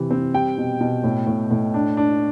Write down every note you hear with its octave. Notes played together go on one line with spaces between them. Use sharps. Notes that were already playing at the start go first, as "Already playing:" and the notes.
Already playing: C3 E3
C4
G3 G5
B2
B2
A2
A2
A2
D4
D4